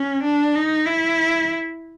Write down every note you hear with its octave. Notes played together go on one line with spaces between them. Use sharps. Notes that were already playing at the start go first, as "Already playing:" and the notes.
Already playing: C#4
D4
D#4
E4